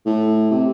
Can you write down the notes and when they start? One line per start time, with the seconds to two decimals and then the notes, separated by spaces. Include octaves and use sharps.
0.06 A2
0.51 C3